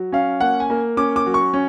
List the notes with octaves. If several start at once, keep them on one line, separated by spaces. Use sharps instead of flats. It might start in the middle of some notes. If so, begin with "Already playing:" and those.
Already playing: F#3
C#4 F5
A#3 F#5
G#5
A#3
C#4 D6
D6
F#3
C#6
C#4